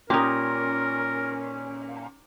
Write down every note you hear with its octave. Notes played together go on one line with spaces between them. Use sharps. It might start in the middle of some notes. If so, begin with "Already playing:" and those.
A#2 C#4 D#4 G4 A#4